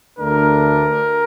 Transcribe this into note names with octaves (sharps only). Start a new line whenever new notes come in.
D2 D3 A3 D4 A#4